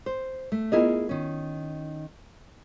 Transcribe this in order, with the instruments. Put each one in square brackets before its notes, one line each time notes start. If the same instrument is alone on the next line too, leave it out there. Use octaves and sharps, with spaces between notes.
[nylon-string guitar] C5
A3
[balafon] B3 F4 D#5 [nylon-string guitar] E4 G#4 A#4
[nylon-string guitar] D#3 C#4